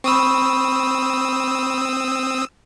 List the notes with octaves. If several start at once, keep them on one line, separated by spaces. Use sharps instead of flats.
C4 B5 C#6 D#6 E6